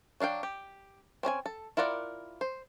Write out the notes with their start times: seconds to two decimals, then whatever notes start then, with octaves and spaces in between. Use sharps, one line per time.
0.20 F#3 D4 F5 G5
0.43 G4
1.23 C4 C#4 D#5 G#5
1.46 A4
1.77 E4 F4 A#4 D5 F#5
2.41 C5